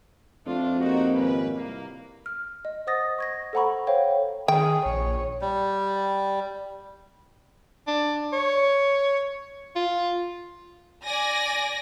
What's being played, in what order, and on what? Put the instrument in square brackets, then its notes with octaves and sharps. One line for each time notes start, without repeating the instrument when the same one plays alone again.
[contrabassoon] F2 [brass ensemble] A3 D4 [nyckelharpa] F4
[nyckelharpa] A#3 G4 [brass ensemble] D#4 F#4
[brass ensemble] G#1 C#4 B4
C2 A#3
[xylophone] F6
D#5
C5 F#5 D#6 A6 A#6
C#6 G#6 A#6
A4 C5 F#5 A#5 B5 C#6
C5 C#5 F5 G5
[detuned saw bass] D#3 [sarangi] G#4 [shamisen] G5
[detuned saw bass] A#1 [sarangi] C#5
[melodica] G3
[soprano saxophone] D4
C#5
F4
[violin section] D5 G#5 A#6